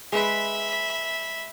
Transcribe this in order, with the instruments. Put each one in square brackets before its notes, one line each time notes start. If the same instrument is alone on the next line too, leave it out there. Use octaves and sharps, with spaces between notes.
[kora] G#3 B4 [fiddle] E5 B5